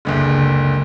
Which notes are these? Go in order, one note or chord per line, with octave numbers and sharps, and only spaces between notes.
F#1 C#2 D3